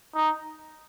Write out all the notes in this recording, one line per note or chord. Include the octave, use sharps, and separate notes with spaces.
D#4